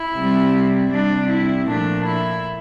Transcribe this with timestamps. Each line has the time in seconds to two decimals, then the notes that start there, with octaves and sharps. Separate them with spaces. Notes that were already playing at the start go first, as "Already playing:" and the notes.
Already playing: E4
0.15 C3 G3
0.91 C3 G3 D4
1.30 E4
1.68 A#2 F3 A3 D4
2.06 E4